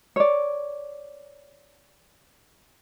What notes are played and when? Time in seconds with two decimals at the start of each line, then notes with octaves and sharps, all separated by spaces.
0.16 C#5 D5